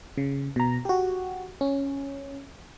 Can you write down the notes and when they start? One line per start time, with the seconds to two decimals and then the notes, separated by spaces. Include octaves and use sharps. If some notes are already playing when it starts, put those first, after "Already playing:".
0.17 C#3
0.56 B2 A#5
0.85 F#4 G4
1.61 C#4